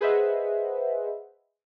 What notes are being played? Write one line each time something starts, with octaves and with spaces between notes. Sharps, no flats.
G#4 B4 C5 D#5 E5 F#5